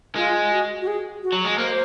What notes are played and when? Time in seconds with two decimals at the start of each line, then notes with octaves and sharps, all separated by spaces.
0.16 G#3 F4
0.51 F#4
0.81 F#4
0.87 G#4
1.23 F#4
1.33 F#3
1.45 G#3
1.58 A#3 C5